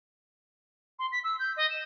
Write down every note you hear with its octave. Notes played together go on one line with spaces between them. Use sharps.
C6
B6
E6
G6
D#5
E7